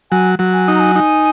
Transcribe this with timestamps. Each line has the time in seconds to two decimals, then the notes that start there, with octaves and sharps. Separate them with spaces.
0.11 F#3 G#5
0.39 F#3
0.53 G#5
0.68 D#4
0.75 A#5
0.80 G#5
0.96 D#4